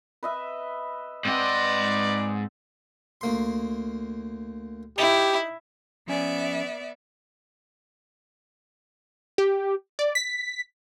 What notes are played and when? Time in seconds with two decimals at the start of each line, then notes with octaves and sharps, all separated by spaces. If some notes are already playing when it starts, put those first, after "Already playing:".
0.23 B4 D#5 E5
1.25 G#2 C4 B4 C5 D5 D#5 F#5
3.21 D2 A#3 C6
4.98 D#4 E4 G4
6.07 F3 B3 C#4 D5 E5 G#5
9.38 G4
9.99 D5
10.15 B6